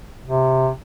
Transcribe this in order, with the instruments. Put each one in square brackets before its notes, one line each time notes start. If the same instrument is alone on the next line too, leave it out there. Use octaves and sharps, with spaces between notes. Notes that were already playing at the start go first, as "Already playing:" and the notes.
[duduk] C3